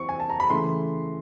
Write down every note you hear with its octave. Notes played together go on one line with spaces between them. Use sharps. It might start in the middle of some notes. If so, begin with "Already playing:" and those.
Already playing: E3 C4 C#6
G#5
A5
A#5
B5
C#3 E3 A3 C6